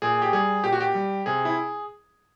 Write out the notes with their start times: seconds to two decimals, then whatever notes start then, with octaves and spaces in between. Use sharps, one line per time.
0.02 A#2 G#4
0.22 G4
0.33 G3 G#4
0.64 A#2 G4
0.72 F#4
0.80 G4
0.94 G3
1.26 C3 G#4
1.45 E4